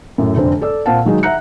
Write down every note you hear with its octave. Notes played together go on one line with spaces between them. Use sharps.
F#2 A2
F1 D3 C4
A4 D5 E6
A#2 C4 F5 F#5 A5
D#3 F#3 G#3 D#4
E5 F#5 A#5 F#6 C#7